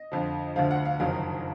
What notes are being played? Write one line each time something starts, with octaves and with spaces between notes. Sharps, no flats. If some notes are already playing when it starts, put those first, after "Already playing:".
Already playing: D#5
F2 D3 F3
D2 D3 F3 F5
F#5
F5
F#1 F2 D#3 F#3 F5